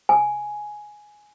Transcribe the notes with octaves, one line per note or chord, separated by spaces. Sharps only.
G#5